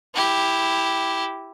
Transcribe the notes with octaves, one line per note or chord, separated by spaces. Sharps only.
E4 G4